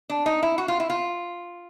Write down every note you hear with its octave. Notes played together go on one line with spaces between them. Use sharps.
D4
D#4
E4
F#4
F4
E4
F4